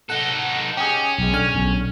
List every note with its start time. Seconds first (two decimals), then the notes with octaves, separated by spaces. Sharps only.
0.10 D#4 A4 F#5
0.77 C#4 G4 G#4
1.18 B1 G#3
1.33 D3 G#5 F6
1.55 B1